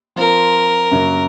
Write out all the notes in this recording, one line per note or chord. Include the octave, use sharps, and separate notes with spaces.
F3 C4 F4 A#4
F#2 C#3 F#3 A#3